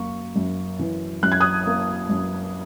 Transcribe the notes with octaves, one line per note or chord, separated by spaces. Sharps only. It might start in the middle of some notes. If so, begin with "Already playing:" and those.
Already playing: F#2 A#3 C#6
F#2
E3
F#2 F#6
G#6
D#6 F#6
A#3
F#2